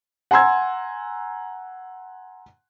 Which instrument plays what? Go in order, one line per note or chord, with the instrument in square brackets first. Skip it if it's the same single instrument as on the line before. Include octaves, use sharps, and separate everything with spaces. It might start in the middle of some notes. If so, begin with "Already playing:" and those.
[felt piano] F#5 G#5 A#5 C6 E6 G#6